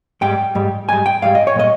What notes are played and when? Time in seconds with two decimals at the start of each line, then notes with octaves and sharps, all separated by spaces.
0.21 G#2 G3 G5
0.55 G#2 G3
0.89 G#2 G3 G#5
1.06 G5
1.22 G#2 G3 F5
1.35 D#5
1.47 C#5
1.56 A#2 G3 D#5